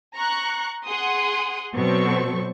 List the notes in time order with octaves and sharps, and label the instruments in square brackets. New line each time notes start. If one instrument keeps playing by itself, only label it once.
[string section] A#5 C#6 F#6
G#4 F#5 C6 D#6
B2 F#3 C4 A4 C#6